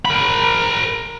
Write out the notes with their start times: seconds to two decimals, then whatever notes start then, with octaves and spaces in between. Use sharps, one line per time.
0.05 A#4 B5